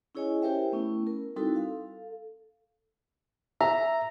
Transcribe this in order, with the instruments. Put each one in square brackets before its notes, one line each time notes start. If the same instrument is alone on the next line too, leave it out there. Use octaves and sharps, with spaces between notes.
[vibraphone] C#4 E4 G#4 C#5 D#5 G#5
E4 G4 A#4 C5 E5 G5
A3 B3 C#4 E4
A#4
G3 C4 D#4 E4 F#4 A4
A4 F5
[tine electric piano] E5 [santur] A#5